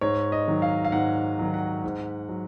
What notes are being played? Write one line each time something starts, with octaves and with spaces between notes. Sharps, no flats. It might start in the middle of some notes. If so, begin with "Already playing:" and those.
G#2 C#5
D#5
D#3 F#3
F5
F5
G#2 F#5
D#3 F#3
F#5
G#2
F#3